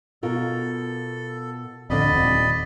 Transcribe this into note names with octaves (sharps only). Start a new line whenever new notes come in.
B2 F4 A4 A#4
D1 F2 D3 D5 D#5 B5
D#1 C4